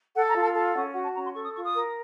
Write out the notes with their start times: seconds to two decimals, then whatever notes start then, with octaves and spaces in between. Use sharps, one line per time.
0.14 A4 F#5
0.27 A#5
0.34 F4
0.40 A5
0.54 A4 A5
0.74 C#4 F#5
0.94 F#4 F#5
1.04 A5
1.13 C#4 A#5
1.24 C6
1.34 A4 C#6
1.44 D#6
1.54 F4 C#6
1.64 D#6
1.74 A#4